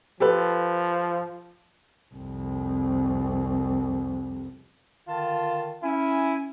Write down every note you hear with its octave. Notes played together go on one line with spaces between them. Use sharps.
F3 G4 A4 B4
C2 F2
D3 D#3 F4 A5
C#4 E4 G#5